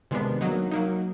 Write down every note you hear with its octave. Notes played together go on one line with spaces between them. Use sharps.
C3 D#3 G#3 B3 D4
F#3 A#3 D#4
F#3 A#3 D#4